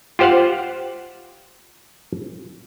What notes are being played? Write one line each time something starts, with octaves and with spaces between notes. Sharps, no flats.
F4 G4 C5 F5 F#5